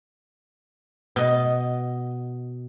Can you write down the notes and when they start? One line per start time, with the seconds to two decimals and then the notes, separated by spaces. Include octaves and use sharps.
1.16 B2 D#5